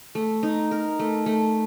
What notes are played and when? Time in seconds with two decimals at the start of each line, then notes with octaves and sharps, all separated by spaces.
0.15 A3
0.43 D#4
0.71 A#4
0.99 A3
1.26 A3